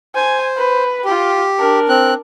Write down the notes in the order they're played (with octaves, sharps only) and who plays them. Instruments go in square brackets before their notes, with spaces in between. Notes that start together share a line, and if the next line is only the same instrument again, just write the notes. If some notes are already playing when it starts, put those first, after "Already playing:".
[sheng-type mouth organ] C5 [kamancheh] G#5
[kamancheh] B4 B5
[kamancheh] F4 G5 [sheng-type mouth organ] G4
[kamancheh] D4 A#4
[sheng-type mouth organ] C4 F#6